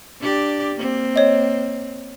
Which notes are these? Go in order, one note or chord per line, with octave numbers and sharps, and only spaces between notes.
D4 G4 D5
A#3 C4
C#5 D#5